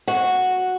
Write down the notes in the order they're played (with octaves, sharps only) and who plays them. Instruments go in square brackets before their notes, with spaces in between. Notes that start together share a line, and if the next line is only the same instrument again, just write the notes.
[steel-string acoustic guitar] F#4